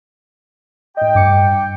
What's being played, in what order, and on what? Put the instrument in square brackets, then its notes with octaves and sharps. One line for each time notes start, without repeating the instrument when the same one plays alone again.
[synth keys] A2 D#5 [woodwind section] G5
[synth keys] G2 D6 C#7